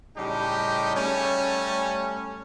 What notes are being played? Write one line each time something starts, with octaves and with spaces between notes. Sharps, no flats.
A2 C#3 G3 D#4 G4
G3 A3 C#4